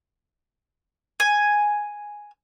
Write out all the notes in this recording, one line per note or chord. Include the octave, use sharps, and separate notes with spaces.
G#5